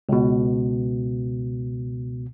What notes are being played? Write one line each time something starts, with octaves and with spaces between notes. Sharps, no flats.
C#2 B2